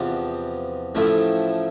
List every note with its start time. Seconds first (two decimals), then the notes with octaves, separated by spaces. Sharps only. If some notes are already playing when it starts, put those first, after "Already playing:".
Already playing: E2 C3 F3 B3
0.95 A1 A2 F3 A3 E4